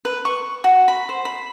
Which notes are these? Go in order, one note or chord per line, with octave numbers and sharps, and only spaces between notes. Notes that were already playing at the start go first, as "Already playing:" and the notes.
B4
C#6
F#4
B5
C5
B5